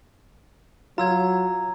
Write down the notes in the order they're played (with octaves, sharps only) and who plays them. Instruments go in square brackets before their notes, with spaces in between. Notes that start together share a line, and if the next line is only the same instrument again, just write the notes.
[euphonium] F#3 [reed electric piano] F4 [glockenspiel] A#5 E6 G#6